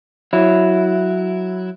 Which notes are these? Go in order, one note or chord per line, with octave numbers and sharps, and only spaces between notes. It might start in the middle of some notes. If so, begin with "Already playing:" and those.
F#3 E4